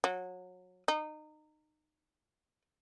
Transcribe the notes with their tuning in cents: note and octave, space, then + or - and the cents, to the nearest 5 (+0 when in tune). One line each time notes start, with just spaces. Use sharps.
F#3 -25
D#4 -25